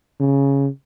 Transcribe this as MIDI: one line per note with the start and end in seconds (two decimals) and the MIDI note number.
0.20 0.68 49